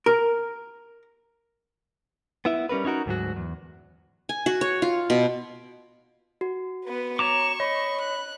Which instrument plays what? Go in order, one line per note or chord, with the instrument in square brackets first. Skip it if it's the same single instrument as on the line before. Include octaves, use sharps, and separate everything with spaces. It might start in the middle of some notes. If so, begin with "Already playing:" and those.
[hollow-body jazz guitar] A#4
[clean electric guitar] B3 E4 E5
G3 C#4 A#4 B4
C#4 D#4 F#4 A#4
D2 G#2 F#3 F#4
E2
[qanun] G#5
F#4
C#5
F4
B2
[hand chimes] F#4
[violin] B3 B4
[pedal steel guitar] C#5 A#5 D6 [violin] C#6 [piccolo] E7
[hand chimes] C#5 [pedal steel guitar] D#5 [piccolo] B5
[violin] F#6